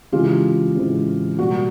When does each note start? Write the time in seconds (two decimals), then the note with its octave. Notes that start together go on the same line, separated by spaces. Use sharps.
0.12 C#3 E3 G#3 C4 F4 G4
0.75 C#3 E3 G#3 C4
1.39 B2 G3 A#3 F#4